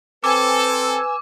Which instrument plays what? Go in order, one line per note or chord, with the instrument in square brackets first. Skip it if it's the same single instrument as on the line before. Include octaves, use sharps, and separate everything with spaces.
[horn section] C4 A4 [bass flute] B4 [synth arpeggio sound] G#5 E6 [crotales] D6